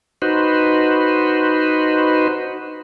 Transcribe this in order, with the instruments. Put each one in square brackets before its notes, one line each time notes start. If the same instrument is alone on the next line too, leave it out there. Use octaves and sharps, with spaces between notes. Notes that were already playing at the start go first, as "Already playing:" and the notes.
[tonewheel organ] D#4 F#4 B4 C5